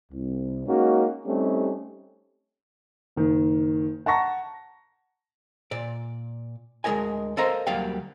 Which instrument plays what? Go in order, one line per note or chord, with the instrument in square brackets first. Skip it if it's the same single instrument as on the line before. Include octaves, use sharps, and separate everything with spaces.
[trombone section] C2
G#3 A#3 C#4 D#4 F#4
G3 A3 C4 C#4 D#4 G4
[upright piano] F#1 D#3
F#5 A5 A#5 C#6 A#6
[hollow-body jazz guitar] A#2 D5
D2 G#3 A3 A#4 D#5 G#5
A4 A#4 C5 D#5 F5 A#5
D2 F#3 G3 A#3 F5 G5